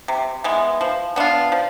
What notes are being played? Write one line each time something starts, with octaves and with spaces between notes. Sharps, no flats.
C3
E3 G#3 B3
F3
B3 D4 F4
F3